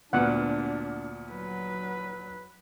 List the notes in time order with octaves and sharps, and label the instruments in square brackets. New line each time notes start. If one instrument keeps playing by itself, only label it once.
[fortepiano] D2 A#2 [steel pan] B3 F#5 [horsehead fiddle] D4
[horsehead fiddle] F#3 B4